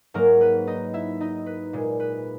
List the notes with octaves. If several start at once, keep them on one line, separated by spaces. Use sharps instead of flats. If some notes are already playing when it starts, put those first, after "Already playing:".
G#2 F#3 A#3 A#4
B4
D#4 D#5
E4 E5
D#4 D#5
B4
A#2 G#3
B4